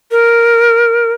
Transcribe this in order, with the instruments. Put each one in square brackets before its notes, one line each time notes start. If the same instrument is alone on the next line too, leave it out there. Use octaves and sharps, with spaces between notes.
[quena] A#4